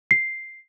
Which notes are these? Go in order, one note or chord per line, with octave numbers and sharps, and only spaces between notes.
C7